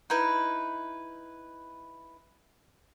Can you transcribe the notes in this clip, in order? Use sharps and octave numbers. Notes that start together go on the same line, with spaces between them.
D#4 E4 B4